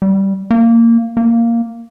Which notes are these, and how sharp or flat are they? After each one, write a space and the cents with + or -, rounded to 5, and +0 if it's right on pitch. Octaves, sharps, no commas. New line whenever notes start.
G3 -10
A#3 -15
A#3 -5